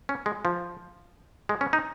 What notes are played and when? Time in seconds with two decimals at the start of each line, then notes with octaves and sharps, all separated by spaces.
0.09 C#4
0.26 G#3
0.45 F3
1.49 G#3
1.61 C#4
1.73 D#4